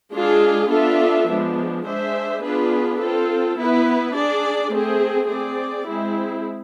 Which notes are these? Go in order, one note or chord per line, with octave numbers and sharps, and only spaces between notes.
G#3 D4 F4 G#4
B3 D4 F4 A4 E5
F3 G#3 B3 D4
G#3 D4 G#4 C5 E5
B3 D4 F4 G#4 B4
C4 F4 A4
B3 E4 B4
D4 G#4 D5
A3 C4 G#4
C4 G#4 D5
G#3 C4 E4 G#4